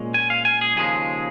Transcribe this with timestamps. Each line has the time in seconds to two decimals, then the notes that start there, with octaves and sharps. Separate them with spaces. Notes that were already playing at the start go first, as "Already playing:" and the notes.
Already playing: A#2 G#3 C#4
0.14 G#5
0.30 F5
0.45 G#5
0.61 G#4
0.77 D#2 C#3 F3 G#3 G#4